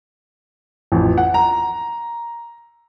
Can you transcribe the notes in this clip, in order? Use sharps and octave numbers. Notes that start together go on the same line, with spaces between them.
A1 F2
F#5
A#5